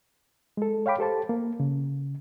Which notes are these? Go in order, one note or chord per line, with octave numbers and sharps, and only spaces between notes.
G#3 A4
C#5 F5 G5 B5 D6
G4 A4 C5 A5
A#3
C#3